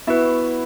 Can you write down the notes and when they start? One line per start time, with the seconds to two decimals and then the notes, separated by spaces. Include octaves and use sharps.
0.07 B3 E4 F#4 B4 E5